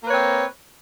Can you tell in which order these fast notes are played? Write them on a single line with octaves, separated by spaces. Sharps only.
A#3 B4 C#5 C4